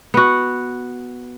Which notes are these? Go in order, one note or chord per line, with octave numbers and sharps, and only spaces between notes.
B3 F#4